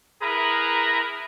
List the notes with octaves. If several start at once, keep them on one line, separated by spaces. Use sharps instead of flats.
E4 G#4 A#4 B4 A#5